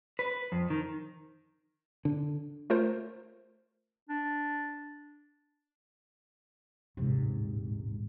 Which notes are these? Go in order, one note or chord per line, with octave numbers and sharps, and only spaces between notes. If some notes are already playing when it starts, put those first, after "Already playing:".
B4
F2
D#3
D3
A3 F4 A#4 C5
D4
D#1 A1 G#2 C3